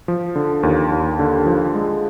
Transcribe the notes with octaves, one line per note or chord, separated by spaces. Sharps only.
F3
D3
D#2
D#2
D3
F3
G#3